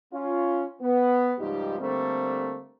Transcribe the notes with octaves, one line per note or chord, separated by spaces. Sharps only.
C#4 F4
B3
C#2 G#2 F3 G3 D#4 G4
D3 G3 A3 A#3 C4